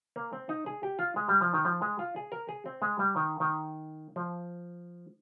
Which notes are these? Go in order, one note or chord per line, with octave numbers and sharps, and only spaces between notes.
A#3
C4
D#4
G#4
G4
F4
G#3
G3
F3
D#3
F3
G#3
F4
G#4
A#4
G#4
C4
G#3
G3
D#3
D#3
F3